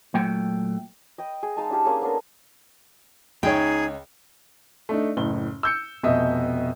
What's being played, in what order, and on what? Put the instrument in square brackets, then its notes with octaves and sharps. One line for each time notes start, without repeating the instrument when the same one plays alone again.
[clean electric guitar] A#2 F#3 A3 G5
[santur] D#5 G5 B5
G#4
G#3 D#4 F5 A5
D4 E4 G4 F5
A#3 C#4 G#4
B3 D4 A4 A#4
[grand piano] C#2 C#5 [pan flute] D#4 [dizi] G#4 [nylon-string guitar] G5
[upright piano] A3 D4 D#4
F#1 A2 G7
E6 G6 C#7
F1 B2 D#5 E5